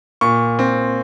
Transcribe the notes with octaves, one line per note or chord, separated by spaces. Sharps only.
A#2 C#6
C4